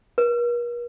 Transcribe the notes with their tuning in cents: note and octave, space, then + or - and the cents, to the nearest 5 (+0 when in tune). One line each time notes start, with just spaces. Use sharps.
A#4 +45